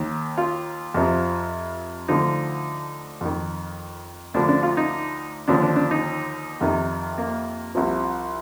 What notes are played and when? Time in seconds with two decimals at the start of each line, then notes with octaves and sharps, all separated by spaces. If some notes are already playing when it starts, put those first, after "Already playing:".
Already playing: D#2 D#3
0.38 F4
0.94 F2 C3 F3
2.08 D2 D3 F3 D#4
3.21 F2 D#3
4.34 D2 D3 F3 D4
4.49 D4
4.63 F4
4.77 D#4
5.48 D#2 D3 F3 D4
5.63 D4
5.76 D4
5.91 D#4
6.61 F2 C3 D#3
7.18 A#3
7.75 C2 C3 F3